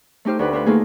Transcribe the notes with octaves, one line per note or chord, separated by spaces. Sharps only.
A3 D#4 G4 C5 F6
D2 G4 B4
D4 F4 B4
A3 A#3 D#4 F4 G#4